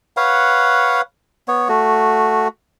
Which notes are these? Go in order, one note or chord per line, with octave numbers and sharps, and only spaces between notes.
B4 C#5 F5 F#5
B3 C#5
A3 F#4